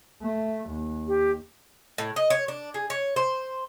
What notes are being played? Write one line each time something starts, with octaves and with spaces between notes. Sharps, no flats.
A3
D#2
G4
A2
D#5
C#5
D4
G#4
C#5
C5